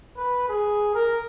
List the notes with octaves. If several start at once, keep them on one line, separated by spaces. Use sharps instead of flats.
B4
G#4
A#4